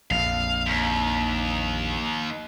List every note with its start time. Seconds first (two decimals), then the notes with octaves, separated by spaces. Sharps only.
0.11 A#1 F2 F5
0.66 D#2